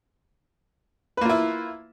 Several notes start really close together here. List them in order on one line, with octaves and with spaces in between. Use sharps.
B4 A#3 F4 E4